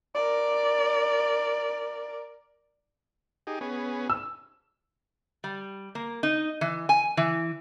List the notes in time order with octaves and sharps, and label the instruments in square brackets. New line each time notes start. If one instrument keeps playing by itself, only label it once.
[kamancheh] A#4 D5
[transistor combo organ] D#4 G4 G#4
B3 C#4 G#4
[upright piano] E6
[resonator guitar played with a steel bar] G3
A#3
D#4
E3
G#5
E3